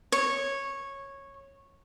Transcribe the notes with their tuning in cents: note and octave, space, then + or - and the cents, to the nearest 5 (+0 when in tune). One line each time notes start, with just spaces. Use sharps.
C#5 -10